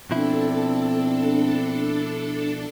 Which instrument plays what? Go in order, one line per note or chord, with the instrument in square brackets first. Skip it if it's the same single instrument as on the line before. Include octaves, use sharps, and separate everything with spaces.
[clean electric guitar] B2 F3 E4 [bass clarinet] C4 [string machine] D4 A4